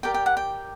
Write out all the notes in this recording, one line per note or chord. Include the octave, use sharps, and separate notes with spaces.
G4 A#4 D5 G5
G5
F#5
G5